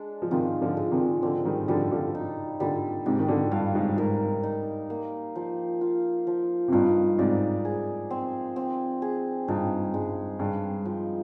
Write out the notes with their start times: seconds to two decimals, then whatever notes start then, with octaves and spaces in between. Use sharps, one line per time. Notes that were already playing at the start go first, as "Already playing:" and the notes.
Already playing: G#3 D4
0.22 F3
0.31 C3 D#3 F4
0.61 D3 F3
0.77 G#3
0.91 C3 D#3
1.22 D3 F3 C4
1.45 D#3 G3
1.68 D3 F3 G3
1.91 D3 F3
2.15 D#4
2.60 A#2 D3 G3
3.06 G#2 C3 G4
3.19 D#3
3.28 A#2 D3
3.51 G2 F5
3.75 G#2
3.97 G#2 A#4
4.43 D#4
4.90 A#3
5.35 F3
5.81 F4
6.27 F3
6.68 C3
6.72 G2 A#2 D#4
7.18 G#2 C3 D5
7.65 G#4
8.11 C4
8.56 C4
9.02 G#4
9.48 G2 A#2 D#4
9.93 G2 G#3
10.39 G2 G#3
10.85 F3